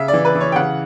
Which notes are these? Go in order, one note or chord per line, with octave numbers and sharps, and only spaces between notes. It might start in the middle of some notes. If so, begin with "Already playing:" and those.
Already playing: C#3 E5
D5
E3
B4
E3
C#5
G5
C#3 F#5